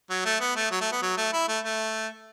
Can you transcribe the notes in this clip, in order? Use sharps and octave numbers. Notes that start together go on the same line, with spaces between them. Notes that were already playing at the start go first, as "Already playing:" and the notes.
F#3
A3
B3
A3
F#3
A3
B3
F#3
A3
E4
A3
A3